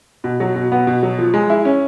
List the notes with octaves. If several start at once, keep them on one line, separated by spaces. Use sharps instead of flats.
B2
F#3
B2
B3
B2
F#3
F3
G#3
E4
C#4